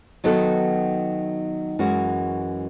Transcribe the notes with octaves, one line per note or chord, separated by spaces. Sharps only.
D#3 F#3 B3 F#4 A4
F#2 E3 G#3 C#4 F#4